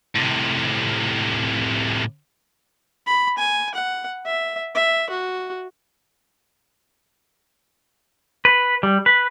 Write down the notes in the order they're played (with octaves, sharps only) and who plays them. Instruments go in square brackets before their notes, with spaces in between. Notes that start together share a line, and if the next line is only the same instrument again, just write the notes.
[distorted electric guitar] A2 C3
[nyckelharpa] B5
G#5
F#5
E5
E5
F#4
[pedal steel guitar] B4
G3
B4